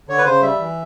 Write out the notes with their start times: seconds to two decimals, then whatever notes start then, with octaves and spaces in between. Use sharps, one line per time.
0.09 D3 C#5
0.18 B4
0.25 C#3 C5
0.42 G3 E5
0.59 E3